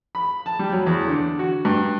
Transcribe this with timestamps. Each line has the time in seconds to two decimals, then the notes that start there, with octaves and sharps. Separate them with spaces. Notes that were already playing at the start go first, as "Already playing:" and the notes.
0.15 B5
0.46 A5
0.59 G3
0.72 F#3
0.86 E2
1.08 D3
1.39 F#4
1.65 G2